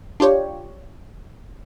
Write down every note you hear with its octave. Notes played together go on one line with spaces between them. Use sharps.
D4 F4 G4 C#5